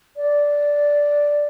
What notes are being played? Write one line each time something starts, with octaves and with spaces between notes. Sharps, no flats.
D5